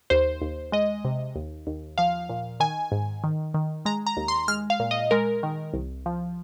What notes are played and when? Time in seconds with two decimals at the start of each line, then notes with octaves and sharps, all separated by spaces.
0.10 D#2 C5
0.42 D#2
0.72 G#3 D#5
1.04 C3
1.36 D#2
1.67 D#2
1.98 F3 F5
2.29 A#2
2.60 D#3 G#5
2.92 G#2
3.24 D#3
3.54 D#3
3.85 G#3 A#5
4.06 A#5
4.17 D#2
4.28 C6
4.48 G#3 F6
4.70 F5
4.80 A#2
4.91 D#5
5.11 G#3 A#4
5.43 D#3
5.74 C2
6.06 F3